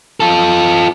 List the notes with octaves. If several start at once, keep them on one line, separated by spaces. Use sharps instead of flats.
F4 A4